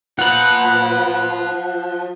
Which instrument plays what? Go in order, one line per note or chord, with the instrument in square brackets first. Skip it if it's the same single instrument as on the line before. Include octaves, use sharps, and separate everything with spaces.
[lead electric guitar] F3 [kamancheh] B3 [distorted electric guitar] F4 A#5 [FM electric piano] F#5 F#6